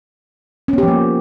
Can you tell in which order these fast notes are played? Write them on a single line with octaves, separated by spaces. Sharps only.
C#4 B3 G4 F3 A#3